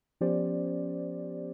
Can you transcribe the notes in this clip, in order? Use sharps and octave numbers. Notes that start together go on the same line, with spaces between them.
F3 B3 C#4 G4 C5 D5